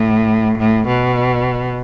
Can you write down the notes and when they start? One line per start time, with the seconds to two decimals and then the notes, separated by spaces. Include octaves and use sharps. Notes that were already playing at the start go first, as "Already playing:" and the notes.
Already playing: A2
0.59 A2
0.87 B2